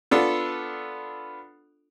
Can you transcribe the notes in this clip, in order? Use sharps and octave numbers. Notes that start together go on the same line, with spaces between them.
B3 D4 F4 A4